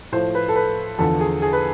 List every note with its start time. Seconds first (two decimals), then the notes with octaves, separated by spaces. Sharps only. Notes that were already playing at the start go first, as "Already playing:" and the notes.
0.12 A2 F3 C5
0.35 B4
0.48 A4
0.56 B4
0.98 E2 D3 F3 A4
1.20 G#4
1.42 G#4
1.52 B4